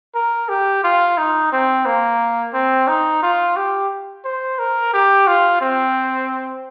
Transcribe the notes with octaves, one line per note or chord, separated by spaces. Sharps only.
A#4
G4
F4
D#4
C4
A#3
C4
D#4
F4
G4
C5
A#4
G4
F4
C4